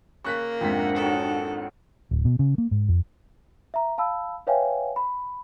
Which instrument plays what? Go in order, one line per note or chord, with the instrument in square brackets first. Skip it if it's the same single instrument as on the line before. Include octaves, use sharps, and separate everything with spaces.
[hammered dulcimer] C#3 [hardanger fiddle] A#3 [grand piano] C#6 F#6 B6
[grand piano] F2 G#2 B6 [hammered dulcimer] C3 C4 [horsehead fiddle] D4 F#5
[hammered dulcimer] D#3 F#3 [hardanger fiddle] A4
[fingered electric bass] D1
B2
C#3
A#3
G#2
F2
[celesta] E5 A#5
F5 A5 B5 E6
B4 C#5 E5 F5 G5 G#5
B5